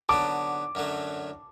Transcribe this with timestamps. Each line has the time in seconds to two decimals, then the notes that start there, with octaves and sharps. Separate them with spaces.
0.09 D3 F#3 B3 A5 D6
0.75 F#2 D3 F#3 A3